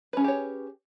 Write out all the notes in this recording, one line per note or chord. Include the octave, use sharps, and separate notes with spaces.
C#4 G4 G#4 B4 C#5